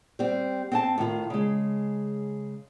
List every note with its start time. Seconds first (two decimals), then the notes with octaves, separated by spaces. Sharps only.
0.19 G3 C4
0.72 C4 F#5 A5
0.98 A2 D#3 F4
1.30 C#3 G#3